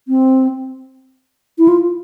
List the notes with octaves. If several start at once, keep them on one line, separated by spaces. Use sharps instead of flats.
C4
E4
F4